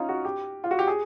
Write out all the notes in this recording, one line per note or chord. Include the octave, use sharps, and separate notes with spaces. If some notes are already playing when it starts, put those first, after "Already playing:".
Already playing: C#4 D#4 F4
F#4
G4
F4
F#4
G4
G#4